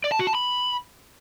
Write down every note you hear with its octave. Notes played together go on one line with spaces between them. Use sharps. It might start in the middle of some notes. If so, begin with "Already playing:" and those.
D5
A5
F#4
A5
B5